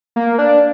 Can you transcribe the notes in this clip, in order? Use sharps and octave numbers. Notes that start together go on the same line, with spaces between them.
A#3
D4